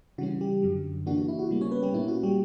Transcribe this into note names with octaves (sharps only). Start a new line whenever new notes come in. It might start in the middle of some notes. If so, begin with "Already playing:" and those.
C#3 E3 G3 C#4 F#4
G3 G4
F#2 D3 F#3
C#3 E3 A#3 D4 F#4
F#4
E4
F#4
C#3 G3 A#3
C#4 C#5
B3 B4
G3 G4
A#2 A#3 C#4 E4
F#4
G3 G4